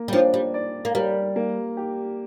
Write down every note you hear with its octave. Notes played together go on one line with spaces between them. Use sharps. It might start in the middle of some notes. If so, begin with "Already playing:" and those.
Already playing: A#3
G3
F3 D4
G3
D5
A#3
G3 A#4
A#3
G4